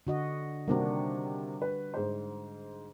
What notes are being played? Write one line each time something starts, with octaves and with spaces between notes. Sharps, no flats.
D3 F#4 D#5
C3 D#3 G3 A#3 D4 F#4
B4
G#2 C5